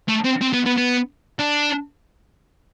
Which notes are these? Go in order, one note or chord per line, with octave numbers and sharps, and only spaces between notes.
A3
C4
C4
B3
B3
B3
D4